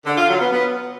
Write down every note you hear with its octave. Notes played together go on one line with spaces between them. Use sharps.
D3
F4
F#3
B3
B3